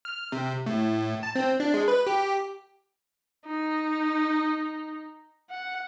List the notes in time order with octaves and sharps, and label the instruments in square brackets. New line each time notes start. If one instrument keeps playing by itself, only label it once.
[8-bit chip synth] F6
C3
A2
A5
C4
D4
G#3
B4
G4
[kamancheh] D#4
F#5